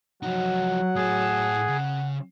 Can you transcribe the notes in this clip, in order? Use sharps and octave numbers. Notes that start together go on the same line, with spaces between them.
F3 F#3 D#4 F#5
A2 G#4 A5
C#3